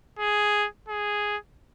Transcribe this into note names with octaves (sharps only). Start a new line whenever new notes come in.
G#4
G#4